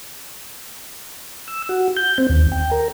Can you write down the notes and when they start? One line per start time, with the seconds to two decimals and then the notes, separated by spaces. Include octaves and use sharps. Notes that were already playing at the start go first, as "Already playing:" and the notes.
1.48 E6
1.69 F#4
1.96 G6
2.18 C4
2.29 D#2
2.52 G5
2.71 A#4